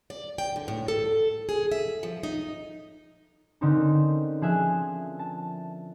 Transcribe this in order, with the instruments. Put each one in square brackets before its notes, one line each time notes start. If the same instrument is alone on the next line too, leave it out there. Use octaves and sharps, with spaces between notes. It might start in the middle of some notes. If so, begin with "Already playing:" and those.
[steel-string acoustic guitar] D5
G5
D3
A2
A4
G#4
E5
F3
D#4
[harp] D3 C4 C#4 D#4 A#4
F3 G#4 E5 F#6
A5